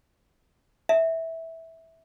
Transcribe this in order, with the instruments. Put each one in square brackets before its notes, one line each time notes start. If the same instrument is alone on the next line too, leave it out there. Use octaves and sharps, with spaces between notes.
[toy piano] E5